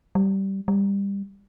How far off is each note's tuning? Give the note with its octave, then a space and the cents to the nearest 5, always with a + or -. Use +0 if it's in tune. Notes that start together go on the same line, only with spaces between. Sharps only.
G3 -15
G3 +20